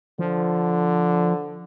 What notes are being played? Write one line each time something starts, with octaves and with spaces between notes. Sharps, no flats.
D3 F3